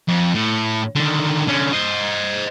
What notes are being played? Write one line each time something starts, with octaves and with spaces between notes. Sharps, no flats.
F2
A2
D3 D#3
D3 C#4
C5 D#5